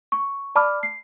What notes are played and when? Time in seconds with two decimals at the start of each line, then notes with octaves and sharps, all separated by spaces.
0.12 C#6
0.55 D5 A5 B5 D6 F6
0.83 C7